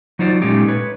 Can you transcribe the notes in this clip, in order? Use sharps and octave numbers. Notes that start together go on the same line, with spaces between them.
F#3 D#4 F4 C5 D5
A#2 G#3 A3 C#4 D#4 G4
B4 C#5